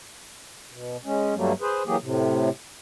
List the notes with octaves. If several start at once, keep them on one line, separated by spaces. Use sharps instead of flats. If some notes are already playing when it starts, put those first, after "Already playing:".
B2
G#3 C#4
G2 F#3 G3 A3 A#3
G#4 B4 C5
E3 F#3 A#3 G4 G#4
A2 C3